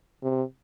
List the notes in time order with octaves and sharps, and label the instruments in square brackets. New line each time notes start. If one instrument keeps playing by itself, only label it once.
[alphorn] C3